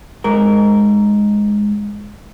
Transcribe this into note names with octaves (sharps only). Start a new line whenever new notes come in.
G#2 A#4